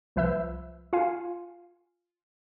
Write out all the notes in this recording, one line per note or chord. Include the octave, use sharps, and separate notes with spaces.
C2 F3 B4 E5 E6 G6
F4 F5 G#5